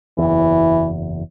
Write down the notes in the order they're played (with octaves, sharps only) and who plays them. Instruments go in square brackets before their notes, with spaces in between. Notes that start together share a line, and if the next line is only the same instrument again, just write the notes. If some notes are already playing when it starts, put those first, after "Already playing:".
[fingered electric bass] F#1 E2 [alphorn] E3